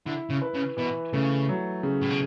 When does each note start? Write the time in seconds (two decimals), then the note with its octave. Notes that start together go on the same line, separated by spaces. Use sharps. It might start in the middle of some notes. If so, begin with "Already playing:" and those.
0.06 D3 E4
0.30 C#3
0.42 B4
0.54 C#3
0.77 B2 E3
1.13 C#3 A3
1.49 F#3
1.83 C#3
2.01 A2
2.10 B2